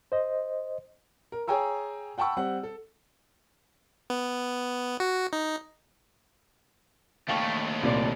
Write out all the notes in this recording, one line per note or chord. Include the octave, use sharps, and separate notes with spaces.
C5 D#5
A#4
G#4 C#5 G5 G#5 A#5 E6
F#5 G5 A5 B5 C#6 E6
G3 C4 F#5
A4
B3
F#4
D#4
D#2 A3 F5 G5 C#6
C2 A#2 D5